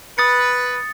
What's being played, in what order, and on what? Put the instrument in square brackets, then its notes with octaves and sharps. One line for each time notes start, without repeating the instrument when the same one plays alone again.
[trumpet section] B4 [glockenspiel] D#6 A6 C#7